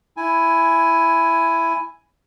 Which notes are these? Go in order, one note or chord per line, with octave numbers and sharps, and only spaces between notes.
E4 G#5